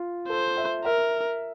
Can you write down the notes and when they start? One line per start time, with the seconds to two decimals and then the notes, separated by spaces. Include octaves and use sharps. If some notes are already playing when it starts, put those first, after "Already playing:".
Already playing: F4
0.29 A4 C5
0.57 E5
0.85 A#4 E5